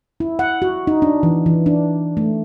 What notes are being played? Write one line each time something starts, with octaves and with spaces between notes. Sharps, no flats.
E4
F#5
F#4
D#4
D4
E3
E3
D4
A3